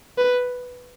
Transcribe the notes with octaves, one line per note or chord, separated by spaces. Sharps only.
B4